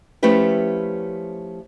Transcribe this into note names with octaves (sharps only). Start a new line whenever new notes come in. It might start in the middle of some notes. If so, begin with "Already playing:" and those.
F3 A3 C#4 E4 G4 B4